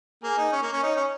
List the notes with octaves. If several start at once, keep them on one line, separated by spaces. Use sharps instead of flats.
A#3 G#4
D#4
C#4
A#3
C#4
D#4 C#5
C#4